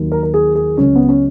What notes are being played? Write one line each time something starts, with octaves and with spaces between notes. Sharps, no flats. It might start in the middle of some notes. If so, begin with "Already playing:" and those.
Already playing: D#2 D#3 F#3
A#4
A#4
G#4
G#4
C#2 C#3 F#3 C#4
B3
C#4